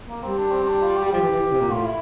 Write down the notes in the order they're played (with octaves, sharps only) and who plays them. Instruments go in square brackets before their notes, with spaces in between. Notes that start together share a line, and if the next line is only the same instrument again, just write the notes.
[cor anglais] A#3
[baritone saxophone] G3 [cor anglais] C4
[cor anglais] D4
C4
C4
D4
F4
G4
[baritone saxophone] G3
[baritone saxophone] F3 [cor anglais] G4
[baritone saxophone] E3
E3
E3
C3
A#2
[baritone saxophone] A2 [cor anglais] F4
[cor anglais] E4